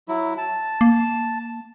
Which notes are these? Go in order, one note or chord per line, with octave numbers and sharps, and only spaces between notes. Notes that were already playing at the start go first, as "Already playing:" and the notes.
F#3 E4
A5
A#3